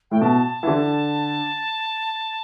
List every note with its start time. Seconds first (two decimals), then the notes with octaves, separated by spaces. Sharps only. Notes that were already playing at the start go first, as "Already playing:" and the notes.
0.11 A2 G5
0.21 B2 A5
0.63 E3
0.67 D3